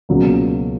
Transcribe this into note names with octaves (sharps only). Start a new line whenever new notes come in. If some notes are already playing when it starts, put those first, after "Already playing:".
C#2 B2 F#3 A#3